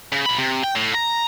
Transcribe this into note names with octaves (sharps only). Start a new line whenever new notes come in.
C#3
A#2 B5
C3
G5
A2
A#5